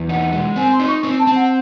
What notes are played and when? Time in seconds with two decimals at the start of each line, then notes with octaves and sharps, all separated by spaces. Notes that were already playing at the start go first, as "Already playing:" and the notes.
Already playing: E2
0.09 D#4 F#5
0.33 G#3
0.56 C4 G#5
0.72 C6
0.80 D#4
0.87 C#6
1.03 C4
1.19 A5
1.27 C4
1.35 F#5